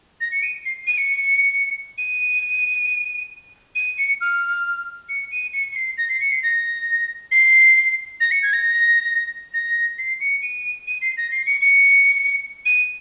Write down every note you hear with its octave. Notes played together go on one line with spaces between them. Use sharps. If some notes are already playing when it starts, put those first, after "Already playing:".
A#6
C#7
D#7
C7
D#7
C#7
D#7
D#7
C#7
F6
C#7
D#7
C#7
C#7
C7
A#6
C7
C#7
C7
A#6
C7
A#6
C#7
G#6
A#6
A#6
C7
C#7
D#7
D#7
C7
A#6
C7
C#7
C#7
D#7